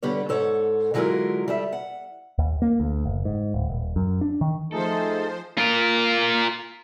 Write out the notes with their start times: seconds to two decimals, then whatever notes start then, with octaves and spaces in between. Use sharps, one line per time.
0.03 D3 G3 B3 C#5
0.29 G#2 A4 C#5 F#5
0.94 D3 F#3 G#3 E4 F4 A#4
1.48 G3 A4 E5
1.73 F#5
2.38 D#2
2.62 A#3
2.80 D2
3.05 F#1
3.25 G#2
3.54 D1
3.70 D#1
3.96 F#2
4.21 D4
4.41 D#3
4.72 F3 A3 D#4 G#4 A4 C5
5.58 F4 A#4